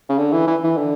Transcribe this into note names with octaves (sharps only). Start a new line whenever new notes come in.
C#3
D3
E3
E3
E3
D3